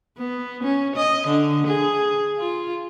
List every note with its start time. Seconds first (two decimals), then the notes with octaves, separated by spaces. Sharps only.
0.18 B3
0.63 C#4
0.95 D#5
1.27 D3
1.67 G#4
2.38 F4